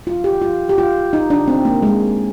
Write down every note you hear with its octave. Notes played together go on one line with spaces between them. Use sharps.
F4
G4
F4
G4
F4
D#4
D4
C4
A#3
G#3